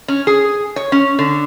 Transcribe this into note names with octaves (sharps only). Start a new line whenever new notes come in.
C#4
G#4
C#5
C#4
D3